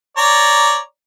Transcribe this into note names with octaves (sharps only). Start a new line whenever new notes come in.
C#5 D5 A#5